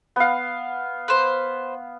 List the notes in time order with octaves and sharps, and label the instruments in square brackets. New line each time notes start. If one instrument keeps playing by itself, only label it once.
[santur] B3 F5
[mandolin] B4 C5